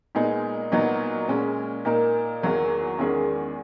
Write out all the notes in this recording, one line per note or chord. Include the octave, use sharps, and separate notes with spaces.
A#2 G#3 B3 D#4 G#4
A#2 F#3 B3 D#4
A#2 G#3 C#4
A#2 A#3 D#4 A#4
E2 D#3 F#3 A#3
E2 D#3 G#3 C#4 G#4